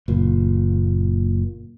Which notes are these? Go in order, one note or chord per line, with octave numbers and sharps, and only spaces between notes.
F#1 A#2